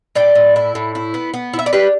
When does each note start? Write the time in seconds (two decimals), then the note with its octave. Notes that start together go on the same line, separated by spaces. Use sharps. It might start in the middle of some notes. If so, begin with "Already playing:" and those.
0.15 A2 D5 G5
0.35 A2
0.56 E4
0.75 A2
0.95 E4
1.14 B3
1.34 B3
1.54 E4
1.59 E5
1.66 D5
1.73 D4 G4 B4